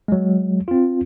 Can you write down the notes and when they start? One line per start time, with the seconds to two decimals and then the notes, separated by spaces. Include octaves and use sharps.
0.08 F#3 G#3
0.68 C4 F4